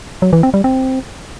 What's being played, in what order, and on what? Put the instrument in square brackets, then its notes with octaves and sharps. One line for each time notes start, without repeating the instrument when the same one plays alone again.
[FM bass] F#3
E3
C4
G3
C4